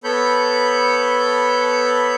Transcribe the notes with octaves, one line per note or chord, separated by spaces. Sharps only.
B3 A4 C#5 B5 G6